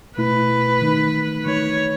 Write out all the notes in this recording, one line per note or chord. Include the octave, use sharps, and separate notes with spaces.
B2 A3 E4 B4
D#3 A3 D#4
D#3 A3 D#4 C#5